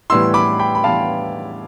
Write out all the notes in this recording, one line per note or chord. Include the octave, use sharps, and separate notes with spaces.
A2 E3 G3 B3 E4 C6 E6
B5 D6
G5 B5
B5
A2 E3 G3 B3 E4 F5 A5